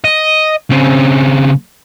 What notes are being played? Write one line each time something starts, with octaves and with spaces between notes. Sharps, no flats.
D#5
C#3 C4